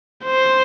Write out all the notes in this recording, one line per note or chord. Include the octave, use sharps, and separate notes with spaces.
C5